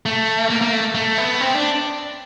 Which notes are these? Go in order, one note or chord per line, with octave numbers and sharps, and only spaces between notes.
A3
A#3
A#3
A3
A3
B3
C4
D4